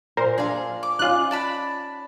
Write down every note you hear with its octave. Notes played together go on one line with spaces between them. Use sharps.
A#2 A#4 C5
D4 F4 G#4 A4 F5
D6
C#4 D#4 F4 F#6
D5 A5 B5